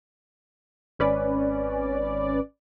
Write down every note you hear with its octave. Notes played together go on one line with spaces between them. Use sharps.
G#1 C#4 B4 D5